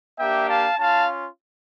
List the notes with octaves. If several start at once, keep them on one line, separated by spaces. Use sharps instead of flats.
A#3 D4 G4 E5 G5
F5 A5
C#4 F4 F5 A5